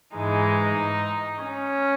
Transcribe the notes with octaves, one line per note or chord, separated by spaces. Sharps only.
G#2 E3 G#3 D#4
C#4